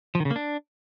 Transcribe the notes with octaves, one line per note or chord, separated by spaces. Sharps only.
F3
D#3
C#3
A#3
D4